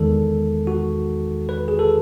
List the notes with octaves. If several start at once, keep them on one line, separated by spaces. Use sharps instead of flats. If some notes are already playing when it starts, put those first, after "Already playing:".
Already playing: E2 D#3 G#3 A4
F#4
B4
G#4
A4